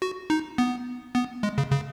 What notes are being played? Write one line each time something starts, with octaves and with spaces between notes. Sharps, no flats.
F#4
D#4
B3
B3
G#3
C#3
C#3